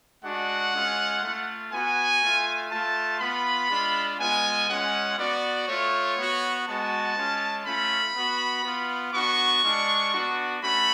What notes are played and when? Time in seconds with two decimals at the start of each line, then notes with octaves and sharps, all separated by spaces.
0.24 G#3 D4 F#4 F#5
0.73 G#3 C#4 F4
1.22 A3 F4
1.72 B3 F#4 G#5
2.22 A3 F4
2.71 A3 F4 A5
3.20 B3 F4 B5
3.70 G#3 D4 F4
4.19 G#3 B3 F4 G#5
4.68 G#3 C#4 F4 F#5
5.18 B3 F#4 D5
5.67 A3 F4 C#5
6.17 B3 F#4
6.67 G#3 B3 F#4 A5
7.17 G#3 C#4 F4
7.66 A3 C#4 F4 B5
8.15 B3 F#4
8.64 B3 F4
9.13 B3 D4 F#4 C#6
9.63 G#3 D4 F4
10.13 B3 D4 F#4
10.62 A3 C#4 F#4 B5